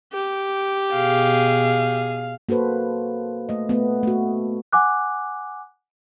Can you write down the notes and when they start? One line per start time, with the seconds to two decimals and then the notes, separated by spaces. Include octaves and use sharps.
0.13 G4
0.94 B2 G#4 F5
2.49 A#3 F#4 A4 B4 C5
3.49 A3 D#5
3.69 A3 B3
4.03 A3 F#4
4.72 F#5 G#5 D6 F#6